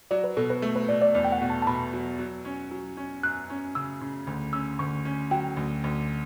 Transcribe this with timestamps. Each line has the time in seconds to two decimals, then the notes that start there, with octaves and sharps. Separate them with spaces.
0.11 F#3 D5
0.24 B4
0.37 B2 A4
0.50 B4
0.62 A3
0.76 B4
0.89 B2 D5
1.01 D5
1.14 E2 D5
1.24 G5
1.32 F#5
1.41 B2
1.50 A5
1.62 A5
1.67 B2 B5
1.93 F#3
2.19 F#3
2.45 C#4
2.71 F#3
2.97 C#4
3.23 F#2 F#6
3.50 C#4
3.75 C#3 E6
4.01 C#3
4.27 D2
4.53 C#4 E6
4.79 D2 C#6
5.05 C#4
5.31 F#3 G5
5.57 D2
5.84 D2